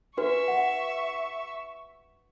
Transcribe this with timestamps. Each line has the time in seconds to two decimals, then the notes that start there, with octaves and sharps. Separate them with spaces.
0.17 D4 F#4 B4 E5 C#6
0.48 F#5